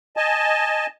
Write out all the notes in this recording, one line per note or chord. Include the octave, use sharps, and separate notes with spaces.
D#5 G#5 A5